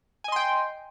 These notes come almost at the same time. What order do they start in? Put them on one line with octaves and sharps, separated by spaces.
G#5 D#5 C6 G5